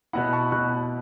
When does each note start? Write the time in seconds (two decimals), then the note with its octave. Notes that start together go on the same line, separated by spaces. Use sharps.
0.13 B2 B3 E4 F#5 B5
0.33 A5 C#6
0.52 B2 B3 E4 C#6 F#6